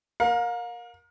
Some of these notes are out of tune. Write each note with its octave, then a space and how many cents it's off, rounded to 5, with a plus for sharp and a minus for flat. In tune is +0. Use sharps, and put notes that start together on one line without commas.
A#4 +10 F5 +35